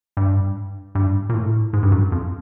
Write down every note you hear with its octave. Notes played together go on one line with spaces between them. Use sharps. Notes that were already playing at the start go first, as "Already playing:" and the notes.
G2
G2
A#2
A2
G#2
G2
F#2
F2